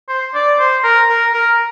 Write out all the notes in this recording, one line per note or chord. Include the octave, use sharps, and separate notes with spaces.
C5
D5
C5
A#4
A#4
A#4